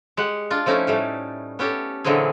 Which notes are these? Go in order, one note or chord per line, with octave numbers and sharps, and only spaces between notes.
G#3 G4 F#5
D4 F4
F3 A3 C#4 D#4 E4
A2 G3 A3
B3 C#4 G4 A4
A#2 D3 E3 F#3 C4 G#4